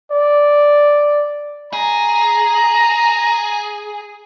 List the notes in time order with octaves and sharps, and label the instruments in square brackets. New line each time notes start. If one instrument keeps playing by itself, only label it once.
[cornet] D5
[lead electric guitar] G#4 [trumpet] A#5